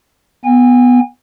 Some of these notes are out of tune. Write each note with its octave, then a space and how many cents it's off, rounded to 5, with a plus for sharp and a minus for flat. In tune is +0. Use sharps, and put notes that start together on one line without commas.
B3 +0 G#5 -35